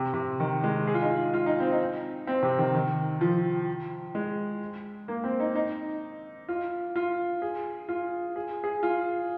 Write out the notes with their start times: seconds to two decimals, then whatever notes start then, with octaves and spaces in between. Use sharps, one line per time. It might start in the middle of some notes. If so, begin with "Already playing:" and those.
Already playing: C3
0.14 C3
0.40 D#3
0.63 G#3
0.87 G#4
0.94 F4
1.02 D#4
1.10 F4
1.34 F4
1.46 D#4
1.60 C4
1.72 D#4
2.27 C4
2.43 C3
2.58 D#3
2.74 D#3
3.21 F3
4.15 G#3
5.08 A#3
5.24 C4
5.40 D#4
5.55 D#4
6.49 F4
6.96 F4
7.42 G#4
7.89 F4
8.36 G#4
8.64 G#4
8.83 F4